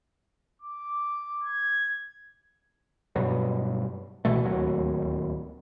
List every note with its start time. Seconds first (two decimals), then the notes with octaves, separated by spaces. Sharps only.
0.62 D6
1.44 G#6
3.16 G2 B2 F#3
4.25 C2 B2 E3 A3
4.43 D1 D#2 F#3